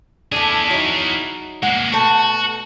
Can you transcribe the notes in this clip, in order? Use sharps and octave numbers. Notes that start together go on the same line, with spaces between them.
A3 D4 E4 G#4
F#3 D#4
G#3 A#3 F#5
B2 A3 F#4